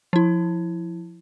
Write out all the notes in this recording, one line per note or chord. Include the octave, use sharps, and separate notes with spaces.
F3 E4